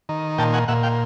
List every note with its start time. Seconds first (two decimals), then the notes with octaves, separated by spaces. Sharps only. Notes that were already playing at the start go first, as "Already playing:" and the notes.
0.09 D#3
0.38 A#2 G5 A5
0.54 F#5 G#5
0.68 A#2 E5 F#5
0.83 F5 G5